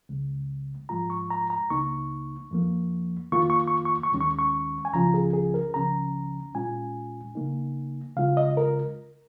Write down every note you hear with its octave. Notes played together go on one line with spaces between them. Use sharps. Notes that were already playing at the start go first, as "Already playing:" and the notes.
C#2 C#3 G#3
G#2 F3 G#3 F4 A#5
C#6
A#5
A#5
C#2 C#3 A#3 D#4 C#6
F2 F3 A#3
F2 D#3 A#3 F4 C#6
C#6
C#6
C#6
C#6
D#2 D#3 G#3 C#4
C#6
C#6
G#5
C#2 C#3 F3 C#4 F4 A#5
G#4
G#4
A#4
C#2 C#3 F3 C#4 A#5
A#2 G#3 C#4 F4 G#5
C#3 A#3 D#4
C#3 G#3 F4 F5
D#5
A#4